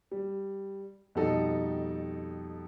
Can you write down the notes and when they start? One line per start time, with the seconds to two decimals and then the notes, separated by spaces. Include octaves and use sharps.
0.11 G3
1.15 F2 B2 G3 D#4 A4